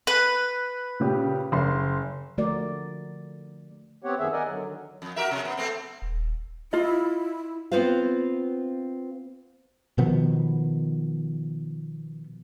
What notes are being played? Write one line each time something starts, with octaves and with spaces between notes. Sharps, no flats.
B4
A#2 C#3 G4
F#1 C6
D3 F3 A3 F#4 A#4 D5
B3 C4 G4 C#5 F#5
F#2 D#3 B3 G#4 E5
A#4 D5 D#5 F#5 G#5
D3 F#3
D#3
F2
F#4 A#4 E5
C3
B3
A3 B3 C4
D#1
E4 F4 D#5
B3 C4 F4 B4 C5 F5
B2 D#3 F3 B3